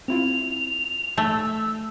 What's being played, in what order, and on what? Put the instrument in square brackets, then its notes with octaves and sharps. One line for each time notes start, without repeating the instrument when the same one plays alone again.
[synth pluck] C4 E4 F4 [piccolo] F7
[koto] A3 [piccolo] E6